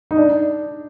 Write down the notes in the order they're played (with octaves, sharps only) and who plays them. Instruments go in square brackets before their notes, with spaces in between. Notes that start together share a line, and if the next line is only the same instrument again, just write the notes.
[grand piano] D#4
D4